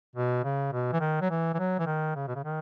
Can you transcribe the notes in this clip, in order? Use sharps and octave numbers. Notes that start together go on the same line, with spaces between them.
B2
C#3
B2
E3
D#3
F#3
E3
E3
F#3
E3
D#3
C#3
B2
C#3
D#3